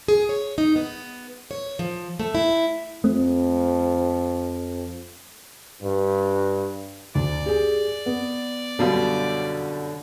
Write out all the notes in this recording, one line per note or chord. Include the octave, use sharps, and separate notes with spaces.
G#4
C#5
D#4
B3
C#5
F3
A3
E4
F2 A3 C4
G2
D2 D5
G4 G#4
B3
F#2 B2 D3 G3 F5